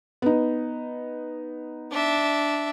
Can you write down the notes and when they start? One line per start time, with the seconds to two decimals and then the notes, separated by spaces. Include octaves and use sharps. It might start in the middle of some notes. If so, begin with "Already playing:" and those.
0.22 B3 D#4
1.91 D4 E5